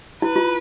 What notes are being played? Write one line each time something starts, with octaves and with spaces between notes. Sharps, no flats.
E4 B4
F4